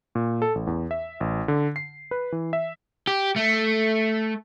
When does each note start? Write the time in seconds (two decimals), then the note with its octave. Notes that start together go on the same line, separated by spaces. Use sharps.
0.15 A#2
0.42 A4
0.55 A1
0.67 E2
0.91 E5
1.20 A1
1.48 D3
1.76 C7
2.11 B4
2.32 E3
2.53 E5
3.07 G4
3.36 A3